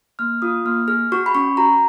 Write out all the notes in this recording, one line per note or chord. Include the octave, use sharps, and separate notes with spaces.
A#3 F6
F4 D#6
A#3 F6
G#4 F6
F#4 C#6
B5
C#4 C#6
F#4 A#5